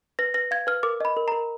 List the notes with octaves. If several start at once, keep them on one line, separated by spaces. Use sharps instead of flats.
B4 A#6
B4 A#6
F5 G#6
B4 F6
A#4 D6
D#5 B5
A#4
A#4 A#5